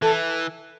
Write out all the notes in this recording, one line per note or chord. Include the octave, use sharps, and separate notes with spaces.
E3 A4